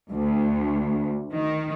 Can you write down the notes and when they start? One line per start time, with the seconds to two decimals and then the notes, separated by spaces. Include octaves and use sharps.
0.12 D2
1.33 D#3